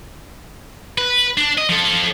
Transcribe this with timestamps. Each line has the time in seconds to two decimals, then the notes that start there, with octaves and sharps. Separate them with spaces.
0.98 B4
1.37 D4
1.58 D#5
1.69 F3 A4